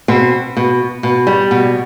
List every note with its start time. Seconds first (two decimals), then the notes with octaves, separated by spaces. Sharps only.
0.08 B2 C4
0.57 B2
1.03 B2
1.27 G3
1.51 B2